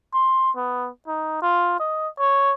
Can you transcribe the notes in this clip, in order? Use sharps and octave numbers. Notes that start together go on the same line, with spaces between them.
C6
B3
D#4
F4
D#5
C#5